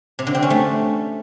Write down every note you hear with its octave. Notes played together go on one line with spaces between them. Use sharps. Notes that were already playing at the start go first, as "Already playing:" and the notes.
C3
D3
C4
C#4
A3